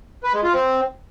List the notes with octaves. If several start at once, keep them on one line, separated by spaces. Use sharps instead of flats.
B4
G#3
F4
C4